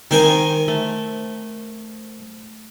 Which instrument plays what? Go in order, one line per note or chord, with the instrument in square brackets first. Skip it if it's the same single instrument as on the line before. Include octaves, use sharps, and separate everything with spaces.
[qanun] D#3 C5 [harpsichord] C4 A#4 G#5
[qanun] A3